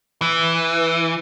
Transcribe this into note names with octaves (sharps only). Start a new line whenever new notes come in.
E3